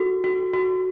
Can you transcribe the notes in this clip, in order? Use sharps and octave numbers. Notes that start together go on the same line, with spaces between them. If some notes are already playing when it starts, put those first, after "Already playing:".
Already playing: F#4 A4
F#4
F#4